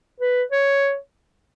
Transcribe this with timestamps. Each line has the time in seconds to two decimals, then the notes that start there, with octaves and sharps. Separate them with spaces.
0.20 B4
0.52 C#5